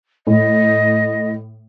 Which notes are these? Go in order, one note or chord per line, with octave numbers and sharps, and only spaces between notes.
A2 D#5